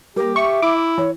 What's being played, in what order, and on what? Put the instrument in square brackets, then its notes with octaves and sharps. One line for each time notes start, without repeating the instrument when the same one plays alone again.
[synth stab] G3 A#3 [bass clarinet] G4 [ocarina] A#4
[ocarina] E5 [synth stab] C#6
[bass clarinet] E4 [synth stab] D6
[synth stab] E3 [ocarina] C#5